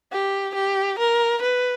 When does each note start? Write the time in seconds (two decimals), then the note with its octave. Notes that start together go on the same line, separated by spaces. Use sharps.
0.12 G4
0.55 G4
0.99 A#4
1.42 B4